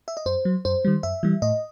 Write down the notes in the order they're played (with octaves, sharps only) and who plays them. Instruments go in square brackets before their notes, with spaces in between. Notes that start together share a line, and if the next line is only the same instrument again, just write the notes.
[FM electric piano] E5
D#5
F#2 C5
F#3
F#2 C5
D#3 G3
F#2 E5
E3 G3
A2 D#5